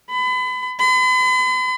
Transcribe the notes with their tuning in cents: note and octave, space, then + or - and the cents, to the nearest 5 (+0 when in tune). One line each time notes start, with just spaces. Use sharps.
B5 +35
B5 +45